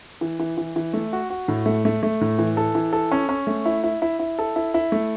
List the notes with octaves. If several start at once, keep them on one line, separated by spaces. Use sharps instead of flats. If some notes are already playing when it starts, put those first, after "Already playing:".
E3
E3
E3
E3
A3
F#4
F#4
A2
A3
A3
A3
A2
E3
A4
E3
A4
C#4
C#4
A3
E4
E4
E4
E4
A4
E4
E4
A3